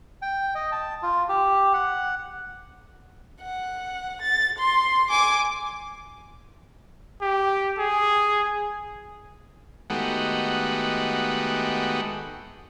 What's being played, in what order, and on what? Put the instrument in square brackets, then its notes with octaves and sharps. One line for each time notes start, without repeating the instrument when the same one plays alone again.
[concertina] G5
D#5
A5
F4
G4
F#5
[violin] F#5
A6
C6
G#5 D6
[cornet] G4
G#4
[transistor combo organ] D#3 G#3 A3 B3 F#4 G4